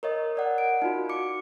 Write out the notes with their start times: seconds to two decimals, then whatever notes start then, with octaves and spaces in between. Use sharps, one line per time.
0.03 A#4 C#5 D#5
0.36 A#4 D5 F#5
0.58 D7
0.82 D#4 F4 F#4
1.09 D6 C#7